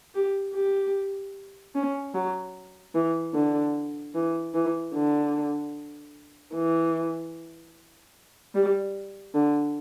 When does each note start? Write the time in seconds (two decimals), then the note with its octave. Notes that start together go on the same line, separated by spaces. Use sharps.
0.15 G4
0.55 G4
1.75 C#4
2.14 F#3
2.95 E3
3.34 D3
4.15 E3
4.54 E3
4.94 D3
6.55 E3
8.55 G3
9.35 D3